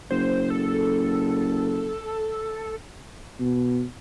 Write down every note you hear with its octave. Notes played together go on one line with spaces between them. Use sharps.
F#1 C5
A4
B2